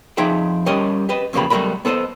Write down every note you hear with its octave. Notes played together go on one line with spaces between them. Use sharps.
F2 F3 D#4 G#4 E5 G5
G3 C#4 G4 A#4 D#5
G4 B4 D#5
E2 C#3 F3 A#3 G4 B5
B2 F#3 G3 A3 A#4 B5
B3 A4 C5 C#5 D#5